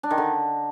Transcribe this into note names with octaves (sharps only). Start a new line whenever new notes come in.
D4
D#3
D3